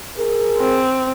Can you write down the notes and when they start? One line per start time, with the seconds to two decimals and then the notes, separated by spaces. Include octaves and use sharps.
0.17 G#4 A#4
0.58 C4